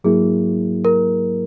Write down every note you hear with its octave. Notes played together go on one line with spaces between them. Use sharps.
G#2 F#3 A#3 E4 G#4
A#4